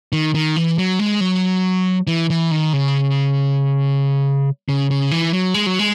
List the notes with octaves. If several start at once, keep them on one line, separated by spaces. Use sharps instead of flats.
D#3
D#3
E3
F#3
G#3
F#3
E3
E3
D#3
C#3
C#3
C#3
E3
F#3
G#3
F#3
G#3